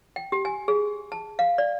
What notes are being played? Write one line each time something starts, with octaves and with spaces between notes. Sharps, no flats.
G5
G4
G#5
G#4
A5
F5
D5